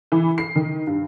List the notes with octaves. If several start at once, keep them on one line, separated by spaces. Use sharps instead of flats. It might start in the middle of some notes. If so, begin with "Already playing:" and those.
E3
C7
D#3
G2